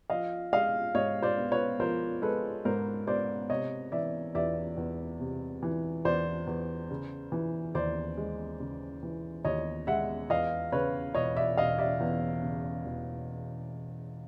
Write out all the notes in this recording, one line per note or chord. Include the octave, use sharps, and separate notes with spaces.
F3 D#5 F5
G#3 D#5 F5
G#2 C#5 D#5
C5 D5
B3
B4 C#5
F3 A#4 C5
G#3 A4 B4
G#2 A#4 C5
B3 C5 D5
C3 C#5 D#5
E3 D5 E5
E2 D5 E5
E2
C3
E3
E2 C5 D5
E2
C#3
E3
D#2 C5 D5
G#3
C#3
E3
D#2 C#5 D#5
G#3 E5 F#5
E2 D#5 F5
C#3 B4 C#5
E1 C#5 D#5
D5 E5
E1 D#5 F5
D5 E5
E2
C#3
E1